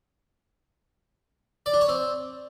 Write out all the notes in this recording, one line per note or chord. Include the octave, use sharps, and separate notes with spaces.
D5
D4
C#5
C4